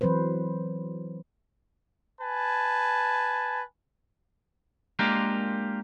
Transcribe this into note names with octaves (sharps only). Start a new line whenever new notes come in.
E3 F#3 C4 B4 C5
B4 G#5 A5
G#3 A#3 D4 F4 G4 A#4